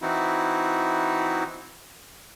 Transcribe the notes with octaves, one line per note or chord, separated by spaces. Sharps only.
E3 C4 D#4 E4 F#4